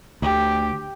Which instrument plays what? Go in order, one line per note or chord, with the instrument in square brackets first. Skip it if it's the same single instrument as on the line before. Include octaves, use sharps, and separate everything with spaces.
[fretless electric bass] D2 [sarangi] G4